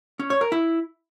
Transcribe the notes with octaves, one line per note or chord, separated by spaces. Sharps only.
C#4
C#5
A#4
E4